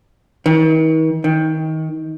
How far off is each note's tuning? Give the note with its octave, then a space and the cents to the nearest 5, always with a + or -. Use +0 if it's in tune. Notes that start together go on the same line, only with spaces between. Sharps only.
D#3 +45
D#3 +25